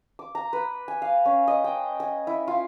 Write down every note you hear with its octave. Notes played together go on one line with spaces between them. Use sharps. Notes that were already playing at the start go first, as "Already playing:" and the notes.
D6
A#5
B4
G#5
F5
C#4
D#5
G5
G#5
E4
F4